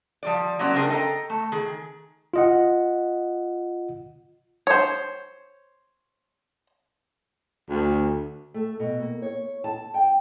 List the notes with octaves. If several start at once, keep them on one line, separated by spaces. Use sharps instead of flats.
F3 G3 D5
F#3 A#3 C4 C#4 F#4 D5
C#3 G3 C4 D4 G#4 A#4
A4 D#5 G5 A#5
A3
D#3 G#4
F4 D#5 F#5
C5 C#5
D2
A3
B2
A#3
C#5
A5
G5